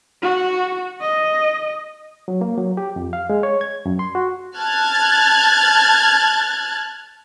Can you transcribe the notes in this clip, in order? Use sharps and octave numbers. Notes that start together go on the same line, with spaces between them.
F#4
D#5
F#3
A#3
F#3
G4
F2
F5
G#3
C#5
G#6
F#2
C6
F#4
A5 F6 F#6 G#6 A6